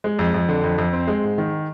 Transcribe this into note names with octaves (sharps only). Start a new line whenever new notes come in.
G#3
F2
F2
D3
F2
F2
C4
G#3
G#2
D#3